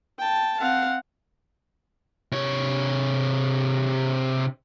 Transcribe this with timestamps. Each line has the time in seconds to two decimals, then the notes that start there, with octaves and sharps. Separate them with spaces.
0.19 G5 A5
0.61 C4 F5 F#5
2.32 C3 C#5